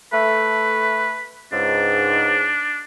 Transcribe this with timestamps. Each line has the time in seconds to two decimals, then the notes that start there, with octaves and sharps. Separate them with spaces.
0.13 A3 B4
1.52 C#2 G#2 D4